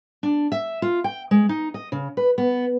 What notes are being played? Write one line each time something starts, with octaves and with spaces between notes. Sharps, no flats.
D4
E5
F4
G5
G#3
D#4
D#5
C#3
B4
B3